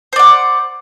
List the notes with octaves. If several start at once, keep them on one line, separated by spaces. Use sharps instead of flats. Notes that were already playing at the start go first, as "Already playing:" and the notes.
C5 D5 F#5